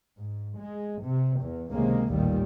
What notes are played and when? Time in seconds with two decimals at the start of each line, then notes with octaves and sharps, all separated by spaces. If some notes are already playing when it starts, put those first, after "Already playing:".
0.18 G#2
0.59 G#3
1.03 C3
1.40 E2
1.71 C#2 C3 D#3 G#3 A#3
2.10 A1 D#2 A#2 D#3 G3